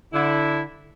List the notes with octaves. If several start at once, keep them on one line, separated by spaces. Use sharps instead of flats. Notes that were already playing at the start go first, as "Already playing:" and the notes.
D3 E4